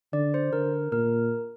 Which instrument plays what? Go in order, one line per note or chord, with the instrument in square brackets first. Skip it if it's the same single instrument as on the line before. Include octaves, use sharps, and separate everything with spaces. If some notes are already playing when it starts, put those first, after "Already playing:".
[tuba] D3 [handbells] D5
[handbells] C5
[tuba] D3 [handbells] A#4
[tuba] A#2 [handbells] A#4